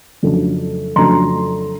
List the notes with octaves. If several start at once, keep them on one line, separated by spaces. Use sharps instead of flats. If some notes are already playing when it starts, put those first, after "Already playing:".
F2 C#3 F#3 A3 D4
F2 C#3 F#3 A3 D4 A#5 C6